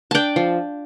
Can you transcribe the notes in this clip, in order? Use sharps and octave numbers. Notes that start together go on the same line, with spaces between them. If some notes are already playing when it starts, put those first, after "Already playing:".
D4 D5 G5 A5
F3